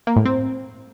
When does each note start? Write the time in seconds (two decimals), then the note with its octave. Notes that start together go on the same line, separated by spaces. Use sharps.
0.07 A#3
0.16 A2
0.25 C4